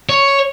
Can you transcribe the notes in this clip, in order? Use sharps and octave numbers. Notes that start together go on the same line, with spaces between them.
C#5